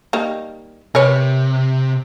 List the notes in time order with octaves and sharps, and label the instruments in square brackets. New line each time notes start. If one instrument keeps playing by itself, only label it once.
[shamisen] D#3 G3 A#3
[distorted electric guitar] C3 [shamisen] A#4 B4 C#5